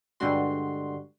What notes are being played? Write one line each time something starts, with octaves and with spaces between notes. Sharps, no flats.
G2 D3 G3 G#3 F#4 C6